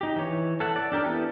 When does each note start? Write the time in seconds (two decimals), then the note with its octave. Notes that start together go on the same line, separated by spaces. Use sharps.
0.01 D#4 G4
0.16 E3 C#5
0.60 A4 E5 F#5
0.76 D5
0.92 D4 G4 A#4
1.04 E3 B3 E4 G4 A4